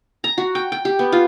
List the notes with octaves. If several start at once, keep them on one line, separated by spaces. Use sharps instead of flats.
A#5
F#4
G5
G5
G4
B3
F4